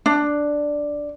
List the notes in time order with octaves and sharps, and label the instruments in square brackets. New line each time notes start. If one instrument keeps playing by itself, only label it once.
[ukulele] D4